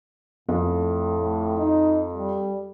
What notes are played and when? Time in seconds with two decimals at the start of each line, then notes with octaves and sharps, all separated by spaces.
0.49 F2 A2
1.18 A2
1.58 D#4
2.13 G3